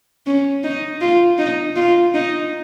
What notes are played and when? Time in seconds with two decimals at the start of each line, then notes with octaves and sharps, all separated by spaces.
0.26 C#4
0.64 D#4
1.01 F4
1.38 D#4
1.76 F4
2.14 D#4